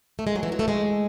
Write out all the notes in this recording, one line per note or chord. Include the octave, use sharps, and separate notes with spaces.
A3
G#3
F#3
E3
F#3
A3
G#3